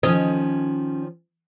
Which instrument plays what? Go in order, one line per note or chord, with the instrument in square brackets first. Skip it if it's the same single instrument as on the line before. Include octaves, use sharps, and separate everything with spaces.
[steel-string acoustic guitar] D#3 F3 [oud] C#4 D#5